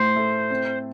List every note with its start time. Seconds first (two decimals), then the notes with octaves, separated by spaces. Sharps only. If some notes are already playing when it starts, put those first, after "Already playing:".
Already playing: A2 A3 C5
0.16 A3
0.50 C4